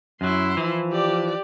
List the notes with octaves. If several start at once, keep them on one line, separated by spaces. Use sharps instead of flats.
F#2 F#3 E4 C6
E3 F3
G4 D5